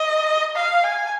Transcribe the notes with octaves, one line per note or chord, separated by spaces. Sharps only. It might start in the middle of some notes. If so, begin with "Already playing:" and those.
Already playing: D#5
F5
G#5